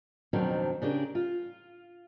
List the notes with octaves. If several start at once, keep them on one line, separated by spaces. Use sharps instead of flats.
F2 B2 D#3 F#3 C4 D4
C#3 D4 G4 A#4
F4